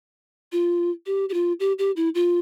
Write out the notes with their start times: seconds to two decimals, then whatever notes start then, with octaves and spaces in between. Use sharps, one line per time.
0.52 F4
1.06 G4
1.29 G4
1.34 F4
1.60 G4
1.79 G4
1.96 E4
2.15 F4